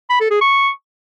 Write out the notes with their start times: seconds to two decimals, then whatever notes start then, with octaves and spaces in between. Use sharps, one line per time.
0.10 B5
0.21 A4
0.31 G#4
0.41 C#6